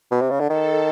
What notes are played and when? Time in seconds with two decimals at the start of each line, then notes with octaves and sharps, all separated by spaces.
0.11 B2
0.21 C3
0.30 C#3
0.40 D3
0.50 D#3 A4